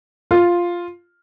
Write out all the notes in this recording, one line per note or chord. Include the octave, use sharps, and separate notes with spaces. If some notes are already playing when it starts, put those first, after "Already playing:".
F4